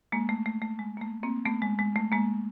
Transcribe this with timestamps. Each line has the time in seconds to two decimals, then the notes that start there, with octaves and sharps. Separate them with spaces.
0.12 G#3 A#3
0.29 A3
0.46 A3
0.62 A3
0.79 G#3
0.97 A#3
1.01 A3
1.23 A#3 C4
1.45 A3 B3
1.62 G#3
1.79 G#3
1.96 A3
2.12 G#3 A#3